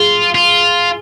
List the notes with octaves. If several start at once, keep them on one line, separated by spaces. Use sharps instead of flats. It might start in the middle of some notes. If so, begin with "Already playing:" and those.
Already playing: F4 G#4
F4